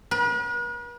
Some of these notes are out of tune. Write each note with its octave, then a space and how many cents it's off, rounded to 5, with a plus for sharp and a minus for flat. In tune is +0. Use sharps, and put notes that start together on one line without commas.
B4 -45